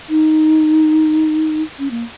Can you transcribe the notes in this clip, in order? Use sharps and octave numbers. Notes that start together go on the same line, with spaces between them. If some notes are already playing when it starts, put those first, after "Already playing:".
D#4
C#4
A#3